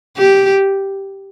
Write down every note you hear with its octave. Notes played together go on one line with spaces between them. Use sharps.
G4